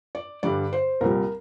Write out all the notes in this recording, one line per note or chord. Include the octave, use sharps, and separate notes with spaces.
D5
G2 D3 G3 D5
C5
C2 A#2 G3 A#4